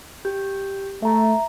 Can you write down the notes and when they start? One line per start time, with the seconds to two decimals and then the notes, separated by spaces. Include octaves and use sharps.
0.25 G4 G6
1.03 A3 E5 A#5